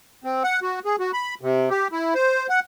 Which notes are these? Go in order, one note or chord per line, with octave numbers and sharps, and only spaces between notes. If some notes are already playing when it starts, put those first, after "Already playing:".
C4
F#5
F#4
G#4
F#4
B5
C3
G4
E4
C5
F#5